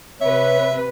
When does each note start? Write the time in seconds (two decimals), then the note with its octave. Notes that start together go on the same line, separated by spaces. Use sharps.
0.21 C3 B4 C#5 E5